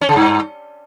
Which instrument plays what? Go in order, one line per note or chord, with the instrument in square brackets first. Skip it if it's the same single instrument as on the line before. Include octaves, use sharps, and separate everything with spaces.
[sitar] C#4
C#3
G2